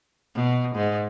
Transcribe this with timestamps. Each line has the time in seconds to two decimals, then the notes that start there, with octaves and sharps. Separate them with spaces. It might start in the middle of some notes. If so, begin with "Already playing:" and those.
0.35 B2
0.75 G#2